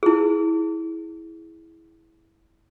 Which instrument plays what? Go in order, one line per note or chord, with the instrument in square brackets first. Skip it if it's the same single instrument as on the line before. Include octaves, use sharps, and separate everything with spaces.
[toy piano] E4 G#4